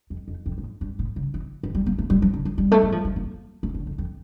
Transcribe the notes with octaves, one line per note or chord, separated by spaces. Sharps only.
F2
F2
F2
A2
G2
A2
C#3
E3
E3
G3
A#3
A3
G3
F3
D3
F3
G3
A3
G3
F3
G3
A#3
A3
D3
F2
F2